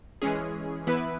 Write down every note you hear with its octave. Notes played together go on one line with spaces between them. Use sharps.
E3 G#3 C#4 G#4
E3 B3 E4 B4